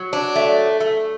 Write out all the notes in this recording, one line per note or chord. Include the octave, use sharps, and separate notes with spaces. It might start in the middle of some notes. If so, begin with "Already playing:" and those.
Already playing: F#3
D4
A3
A3